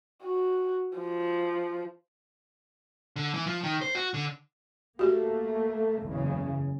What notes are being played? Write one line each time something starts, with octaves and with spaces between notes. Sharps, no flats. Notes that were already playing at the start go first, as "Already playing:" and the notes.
F#4
F3
D3
E3
F3
D#3
C5
F#4
D3
A3 A#3 F#4 G4
F#1 E2 C#3